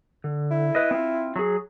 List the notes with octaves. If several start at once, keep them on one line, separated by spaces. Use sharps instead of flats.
D3
E4
B4 D#5
C4 F4
F#3 G#4